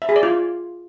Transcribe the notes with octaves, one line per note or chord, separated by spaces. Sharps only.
E5
G#4
D5
F4